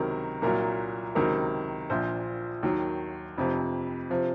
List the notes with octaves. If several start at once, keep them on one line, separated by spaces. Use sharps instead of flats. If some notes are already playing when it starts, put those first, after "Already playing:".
Already playing: C#2 C3 D#3 F#3 A#4
C2 A#2 F#3 A#4
C#2 C3 D#3 F#3 A#4
A#1 A#2 F3 C5
D#2 D#3 F#3
F1 F2 C3 F3
C3 F3